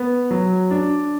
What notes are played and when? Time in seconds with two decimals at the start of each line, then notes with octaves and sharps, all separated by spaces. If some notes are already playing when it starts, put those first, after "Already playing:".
Already playing: B3
0.31 F#3
0.71 D4